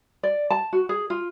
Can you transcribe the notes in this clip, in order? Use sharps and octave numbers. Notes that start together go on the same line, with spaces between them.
D5
A5
F#4
G#4
F4